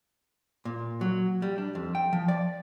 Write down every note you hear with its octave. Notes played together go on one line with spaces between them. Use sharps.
A#2
F#3
G3
D4
F2
G5
F3
D5